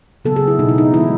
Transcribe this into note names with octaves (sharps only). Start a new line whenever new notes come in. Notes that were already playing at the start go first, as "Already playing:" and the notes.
C#3 F#3 B3 A4
G#4
E4
B2 A3 D#4
E4
D#4
E3 G#3 B3 E4